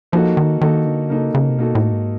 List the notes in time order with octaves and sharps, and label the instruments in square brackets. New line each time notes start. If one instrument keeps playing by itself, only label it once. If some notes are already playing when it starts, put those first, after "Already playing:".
[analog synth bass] F3 [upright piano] A#3 D#4 F#4 A4
[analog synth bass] D#3
[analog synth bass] D#3 [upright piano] A#3 D#4 F#4 A4
[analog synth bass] D3
[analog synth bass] C#3 [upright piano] A#3 D#4 F#4 A4
[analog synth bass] C#3
C3
[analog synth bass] B2 [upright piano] A#3 D#4 F#4 A4
[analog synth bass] A2
G#2